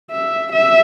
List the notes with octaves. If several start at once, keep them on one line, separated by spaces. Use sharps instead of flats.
E5
E5